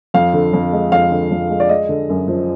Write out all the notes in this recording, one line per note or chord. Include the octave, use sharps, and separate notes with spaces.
F2 F5
D3
F2
G#3
F2 F5
D3
F2
G#3
D5
G#3 D#5
D3
F#2
F3